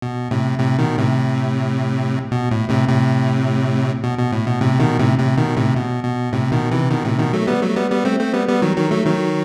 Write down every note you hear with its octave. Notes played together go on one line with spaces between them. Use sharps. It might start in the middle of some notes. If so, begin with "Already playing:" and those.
B2
A2 C3
A2 C3
B2 D#3
A2 C3
B2
A2
A2 C3
A2 C3
B2
B2
A2
B2
A2 C3
B2 D#3
A2 C3
A2 C3
B2 D#3
A2 C3
B2
B2
A2 C3
B2 D#3
C3 E3
B2 D#3
A2 C3
B2 D#3
F#3 A3
G3 B3
F#3 A3
G3 B3
G3 B3
A3 C4
A3 C4
G3 B3
G3 B3
D#3 F#3
D#3 F#3
F#3 A3
D#3 F#3